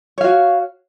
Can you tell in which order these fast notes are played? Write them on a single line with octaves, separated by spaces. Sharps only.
C#5 F5 F#4